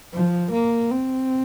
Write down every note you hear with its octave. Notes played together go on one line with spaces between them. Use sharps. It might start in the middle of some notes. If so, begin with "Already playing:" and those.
F3
A#3
C4